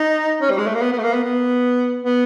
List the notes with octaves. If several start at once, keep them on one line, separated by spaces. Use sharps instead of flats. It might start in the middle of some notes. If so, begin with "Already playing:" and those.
Already playing: D#4
C#4
G3
G#3
A3
A#3
B3
B3
A3
A#3
B3
B3
B3